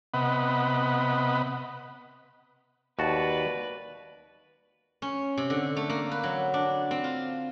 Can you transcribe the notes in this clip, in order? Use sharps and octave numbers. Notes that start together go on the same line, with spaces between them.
C3 B3 D#5 F#5 B5
D#2 F#4 B4 D5 A5
C#4
C3
D3
A3
A#3
B4
F#3
D4
C4
F4